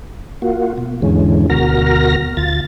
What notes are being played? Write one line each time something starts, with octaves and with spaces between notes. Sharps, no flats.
A#3 F4 F#4
B2
E2 G#2 D3 E3 G#3 C#4
D2 B2 F#4 A#4 F6 A#6
D2 F4 A6